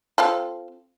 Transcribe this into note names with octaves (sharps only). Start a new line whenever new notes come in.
C4 F4 A4